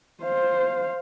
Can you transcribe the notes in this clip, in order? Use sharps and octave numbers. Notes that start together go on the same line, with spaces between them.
C5 F5